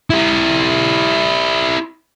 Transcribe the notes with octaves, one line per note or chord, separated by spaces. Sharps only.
E4 G4